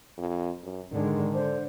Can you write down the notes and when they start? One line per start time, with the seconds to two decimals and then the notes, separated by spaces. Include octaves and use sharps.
0.18 F2
0.63 F#2
0.92 G#2 D3 D#3 G#3
1.34 D3 C5